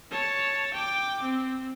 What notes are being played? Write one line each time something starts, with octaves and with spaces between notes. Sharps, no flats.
C#5 A5
G5 D6
C4